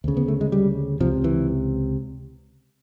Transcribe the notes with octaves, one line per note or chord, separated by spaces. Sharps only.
D2 C#3
B3
A3
G#3
G3
C#2 C3 F3
E3